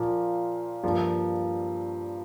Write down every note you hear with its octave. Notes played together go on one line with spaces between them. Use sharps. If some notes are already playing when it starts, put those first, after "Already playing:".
Already playing: A#2 F3 A#3
G2 F3 A#3